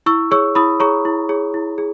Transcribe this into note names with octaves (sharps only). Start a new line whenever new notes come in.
E4 C#6 E6
G#4 C#5 C#6 E6
E4 B5 D#6
G#4 C#5 A#5 C#6
E4
G#4 C#5
E4
G#4